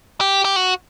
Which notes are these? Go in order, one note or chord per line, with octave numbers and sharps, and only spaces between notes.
G4
G4
F#4